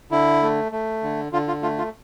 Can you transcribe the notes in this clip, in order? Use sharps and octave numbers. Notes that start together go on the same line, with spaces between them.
D3 E4
A3
A3
D3
D3 F4
F4
A3 F4
F4